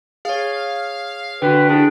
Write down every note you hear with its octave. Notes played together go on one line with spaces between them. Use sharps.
G#4 C#5 F5
D3 F#4 B4 G5
D4 E4 G#4